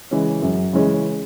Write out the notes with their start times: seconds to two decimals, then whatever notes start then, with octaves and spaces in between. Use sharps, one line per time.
0.11 C#3 E3 G#3 C#4
0.42 F#2
0.73 C#3 E3 G#3 C#4